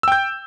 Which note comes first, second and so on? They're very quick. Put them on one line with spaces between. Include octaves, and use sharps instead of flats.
E6 G5 G6